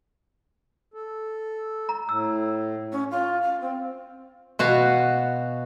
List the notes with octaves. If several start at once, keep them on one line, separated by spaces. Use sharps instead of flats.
A4
A#5
A2 E6
C#4
F4
F5
C4
B2 F#4 F5